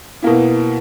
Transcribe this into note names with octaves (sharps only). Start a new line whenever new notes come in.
B2 A#3 E4